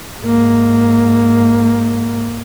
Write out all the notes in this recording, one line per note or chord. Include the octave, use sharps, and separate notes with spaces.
G#2 A#3